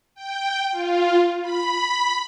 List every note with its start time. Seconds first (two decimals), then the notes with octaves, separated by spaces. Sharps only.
0.15 G5
0.72 F4
1.42 B5